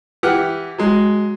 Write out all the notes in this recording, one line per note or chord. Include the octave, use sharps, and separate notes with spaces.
E3 G4 F#5 F6
F#3 G#3